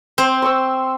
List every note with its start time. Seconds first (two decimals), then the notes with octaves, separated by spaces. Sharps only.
0.18 C4 C5
0.42 C6 C#6 E6